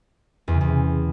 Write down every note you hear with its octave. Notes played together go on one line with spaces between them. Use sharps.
E2
C#3
E2
C3